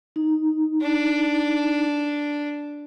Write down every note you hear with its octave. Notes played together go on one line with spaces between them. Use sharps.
D#4
D4